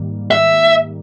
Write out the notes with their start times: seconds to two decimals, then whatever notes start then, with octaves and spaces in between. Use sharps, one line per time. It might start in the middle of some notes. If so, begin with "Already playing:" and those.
Already playing: G#2 D#3 G3 A#3
0.31 E5